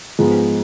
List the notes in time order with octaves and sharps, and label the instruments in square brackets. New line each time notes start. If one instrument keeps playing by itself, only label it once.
[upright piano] G#2 F3 G#3 B3